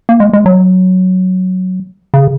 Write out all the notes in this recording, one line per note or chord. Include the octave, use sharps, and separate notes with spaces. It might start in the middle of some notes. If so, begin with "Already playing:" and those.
A#3
G#3
G#3
F#3
C#3